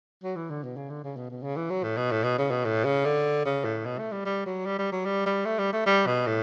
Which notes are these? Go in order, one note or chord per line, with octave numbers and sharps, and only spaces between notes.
F#3
E3
D3
B2
C#3
D3
C#3
B2
B2
C#3
E3
F#3
A2
B2
A2
B2
C#3
B2
A2
C#3
D3
C#3
A2
B2
A3
G3
G3
F#3
G3
G3
F#3
G3
G3
A3
G3
A3
G3
B2
A2